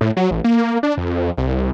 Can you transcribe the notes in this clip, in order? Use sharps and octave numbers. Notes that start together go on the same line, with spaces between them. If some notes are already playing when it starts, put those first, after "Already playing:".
A2
F#3
A1
A#3
D4
F2
C2